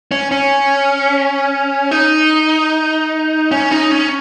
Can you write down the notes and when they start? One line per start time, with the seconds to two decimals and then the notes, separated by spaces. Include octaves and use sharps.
0.11 C#4
0.31 C#4
1.91 D#4
3.51 C#4
3.71 D#4
3.91 C#4